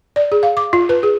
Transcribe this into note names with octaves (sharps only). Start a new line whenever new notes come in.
D5
G#4
F5
D6
F4
B4
G#4